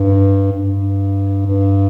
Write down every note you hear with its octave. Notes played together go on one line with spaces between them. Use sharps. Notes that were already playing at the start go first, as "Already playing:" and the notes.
Already playing: G2
G2
G2